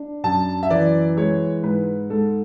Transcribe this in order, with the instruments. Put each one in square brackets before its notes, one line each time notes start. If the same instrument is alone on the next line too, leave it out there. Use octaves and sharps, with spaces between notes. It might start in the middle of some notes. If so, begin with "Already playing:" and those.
Already playing: [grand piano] D4
F#2 A5
E5
E3 D5
G#3 C#5
G#2 B4
G#2 A4